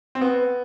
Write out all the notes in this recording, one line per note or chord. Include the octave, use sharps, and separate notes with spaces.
C4
B3